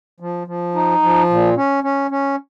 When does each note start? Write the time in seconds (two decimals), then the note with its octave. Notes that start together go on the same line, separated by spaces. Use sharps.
0.20 F3
0.47 F3
0.75 D#4
1.03 F3
1.30 A#2
1.57 C#4
1.84 C#4
2.11 C#4